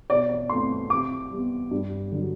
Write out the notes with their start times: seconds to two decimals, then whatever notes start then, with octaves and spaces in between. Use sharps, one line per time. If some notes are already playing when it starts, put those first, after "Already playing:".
0.10 B2 D5
0.29 D5
0.49 A3 C4 C6
0.90 C3 D6
1.30 G3 B3
1.71 G2
2.12 D3 F#3